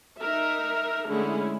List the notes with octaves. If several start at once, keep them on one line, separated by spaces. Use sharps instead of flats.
D#4 A#4 E5
D3 G#3 A3 C#4 E4 G#4